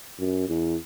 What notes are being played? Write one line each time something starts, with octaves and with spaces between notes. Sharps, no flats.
F#2
E2